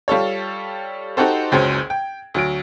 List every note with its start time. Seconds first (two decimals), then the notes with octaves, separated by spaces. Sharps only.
0.08 G3 F4 A4 C#5
1.17 D#4 F#4 G4 A4 C5
1.52 F#1 C#2 F#3 C#4 C5 G#6
1.90 G5
2.34 D2 F#3 D7